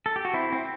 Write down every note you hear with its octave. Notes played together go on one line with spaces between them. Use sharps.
A4
G4
F#4
C4 E4
C4